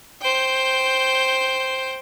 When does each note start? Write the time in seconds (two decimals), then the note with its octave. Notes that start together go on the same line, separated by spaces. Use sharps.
0.21 C5 G5